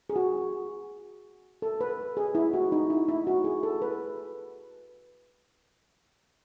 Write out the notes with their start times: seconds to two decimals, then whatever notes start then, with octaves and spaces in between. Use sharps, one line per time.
0.10 G#4
0.16 F#4
1.62 A4
1.81 B4
2.17 G#4
2.35 E4
2.54 F#4
2.72 D#4
2.90 E4
3.08 E4
3.27 F#4
3.44 G#4
3.63 A4
3.82 B4